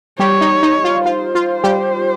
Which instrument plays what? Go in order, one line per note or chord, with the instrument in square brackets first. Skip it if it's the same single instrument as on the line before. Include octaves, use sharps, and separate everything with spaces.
[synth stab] G3 G4 [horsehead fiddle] C#5
[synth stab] D#4
D#4
F4
[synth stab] F4 [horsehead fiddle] C5
[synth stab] F4
G3 G4